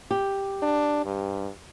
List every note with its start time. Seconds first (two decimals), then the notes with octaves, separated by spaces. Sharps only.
0.11 G4
0.62 D4
1.05 G2